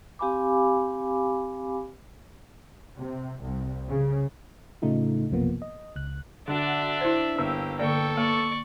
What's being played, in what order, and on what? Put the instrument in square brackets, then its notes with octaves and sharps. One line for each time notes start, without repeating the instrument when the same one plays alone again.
[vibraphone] C4 G4 F5 G#5 B5 D6
[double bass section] C3
C2
C#3
[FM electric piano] A2 C#3 A3 D#4 F4
B1 F#2 C3 F3 A#3 B3
D#5
C#2 F#6
[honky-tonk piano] D3 F#4 [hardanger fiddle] D4 D5 [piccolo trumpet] E5
[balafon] E4 C5
[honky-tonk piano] G1 E6 [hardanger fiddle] A#3 G4
[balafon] D3 A#3 D5 [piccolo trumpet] A4 [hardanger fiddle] G5 C#6
[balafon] A#3 [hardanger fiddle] D5 C#6